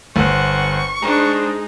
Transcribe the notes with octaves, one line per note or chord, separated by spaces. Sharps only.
G1 C5 F#5 C#6
G#3 D4 D#4 C5 A#5